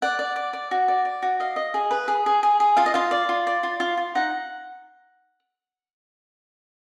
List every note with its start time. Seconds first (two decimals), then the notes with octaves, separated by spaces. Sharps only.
0.02 D5 F#5
0.19 D5
0.36 D5
0.53 D5
0.71 F#4
0.88 D5
1.05 D5
1.22 F#4
1.40 D#5 F5
1.56 D#5
1.74 G#4
1.91 B4
2.08 G#4
2.26 G#4
2.43 G#4
2.60 G#4
2.77 F4 F5
2.86 D#5
2.94 F4 F5
3.11 D5
3.29 F4
3.47 D5
3.63 F4
3.80 F4
3.97 F4
4.15 D#4 F#5